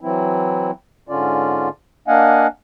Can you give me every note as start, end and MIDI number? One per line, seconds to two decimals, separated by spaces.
0.01 0.71 52
0.01 0.71 54
0.01 0.71 60
0.01 0.71 64
1.09 1.69 44
1.09 1.69 50
1.09 1.69 61
1.09 1.69 65
1.09 1.69 74
2.08 2.47 58
2.08 2.47 62
2.08 2.47 75
2.08 2.47 77
2.08 2.47 78
2.08 2.47 80